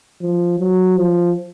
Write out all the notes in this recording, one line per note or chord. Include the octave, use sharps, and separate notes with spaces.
F3
F#3
F3